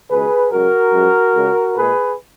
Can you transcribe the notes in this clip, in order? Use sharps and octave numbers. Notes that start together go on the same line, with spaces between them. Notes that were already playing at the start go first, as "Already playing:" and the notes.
C#2 B2 G#3 G#4 B4
F#2 C#3 G#3 F#4 A#4
F#2 F3 G#3
C#2 C#3 G#3
A#2 G#3 G#4 B4